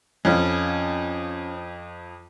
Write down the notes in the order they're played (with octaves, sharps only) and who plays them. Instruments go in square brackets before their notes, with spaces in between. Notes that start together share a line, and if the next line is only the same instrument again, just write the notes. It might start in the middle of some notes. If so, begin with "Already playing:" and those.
[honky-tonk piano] F2 F3 [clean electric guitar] C#4